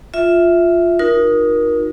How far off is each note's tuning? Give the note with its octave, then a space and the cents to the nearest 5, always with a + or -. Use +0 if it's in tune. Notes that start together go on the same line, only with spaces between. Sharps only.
F4 +0 E5 +0
D#4 +0 F#4 -45 A#4 +25